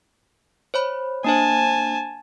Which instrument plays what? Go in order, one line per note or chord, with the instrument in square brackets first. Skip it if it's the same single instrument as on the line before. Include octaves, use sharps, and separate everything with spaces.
[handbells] C5 C#5 B5
[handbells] A#3 D4 C5 [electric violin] G#5 A5